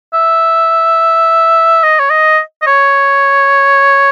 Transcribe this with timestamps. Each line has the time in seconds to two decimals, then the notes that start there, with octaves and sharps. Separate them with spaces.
0.13 E5
1.83 D#5
1.99 C#5
2.10 D#5
2.62 D#5
2.67 C#5